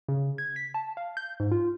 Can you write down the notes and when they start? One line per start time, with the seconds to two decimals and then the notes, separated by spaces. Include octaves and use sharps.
0.08 C#3
0.38 G#6
0.56 B6
0.74 A5
0.97 F5
1.17 G6
1.40 G#2
1.52 F4